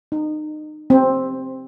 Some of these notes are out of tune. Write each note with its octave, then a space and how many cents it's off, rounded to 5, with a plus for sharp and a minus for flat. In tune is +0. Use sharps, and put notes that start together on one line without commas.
D#4 -30
C4 +10